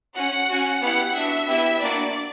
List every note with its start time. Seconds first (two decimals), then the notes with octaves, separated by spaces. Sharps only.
0.15 C#4 F#4 F#5
0.48 C#4 F#4
0.81 B3 E4 G4 F#5
1.15 B3 D4 F#4 E5
1.47 B3 E4 G4
1.81 A#3 D4 F#4 D5